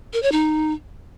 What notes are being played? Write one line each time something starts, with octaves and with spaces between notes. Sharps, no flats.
A#4
C#5
D#4